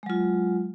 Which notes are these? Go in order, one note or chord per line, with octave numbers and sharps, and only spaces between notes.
F#3 G#3 F4